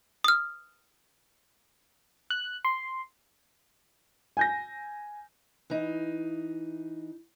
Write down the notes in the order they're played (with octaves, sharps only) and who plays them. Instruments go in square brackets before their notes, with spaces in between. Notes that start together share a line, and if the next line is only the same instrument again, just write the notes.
[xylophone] D#6 F6
[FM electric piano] F#6
C6
[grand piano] G#5 G6 A#6
[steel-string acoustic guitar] E3 D#4